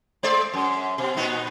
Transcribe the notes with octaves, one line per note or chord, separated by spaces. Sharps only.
G#3 C5 D5
F#2
B2
A#2 B3 D#4